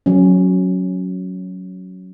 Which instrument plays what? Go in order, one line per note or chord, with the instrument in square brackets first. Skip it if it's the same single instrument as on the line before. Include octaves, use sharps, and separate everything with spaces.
[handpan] F#3 C#4